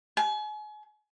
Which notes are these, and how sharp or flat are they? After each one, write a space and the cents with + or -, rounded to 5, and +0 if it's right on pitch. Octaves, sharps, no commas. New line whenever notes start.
G#5 +35